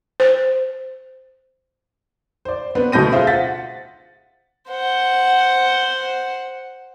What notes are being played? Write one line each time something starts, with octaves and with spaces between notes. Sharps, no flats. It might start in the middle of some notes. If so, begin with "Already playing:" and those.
C5
C5 D5
B3 C4 D4 B4
D2 B2 G6 A#6 D#7
F4 G#4 C5 E5 F5
F#5 A6 B6
C5 F#5